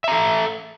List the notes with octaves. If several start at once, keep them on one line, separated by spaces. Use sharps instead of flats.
A4 E5 A#5